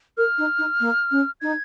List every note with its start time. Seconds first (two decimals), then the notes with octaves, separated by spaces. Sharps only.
0.17 A#4 F6
0.38 D#4
0.58 D#4
0.80 A#3
1.11 C#4
1.41 D#4 G#6